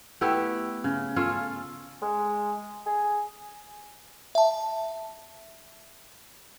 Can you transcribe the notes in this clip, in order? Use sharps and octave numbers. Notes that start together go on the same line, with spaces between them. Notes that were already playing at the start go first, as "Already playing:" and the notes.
A3 B3 E4 G4
C#3
C#4 F4 A4
G#3
G#4
E5 A5